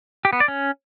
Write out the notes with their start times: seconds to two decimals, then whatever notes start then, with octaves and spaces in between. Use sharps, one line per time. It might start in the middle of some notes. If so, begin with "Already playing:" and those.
0.25 G4
0.33 B3
0.40 D5
0.48 C#4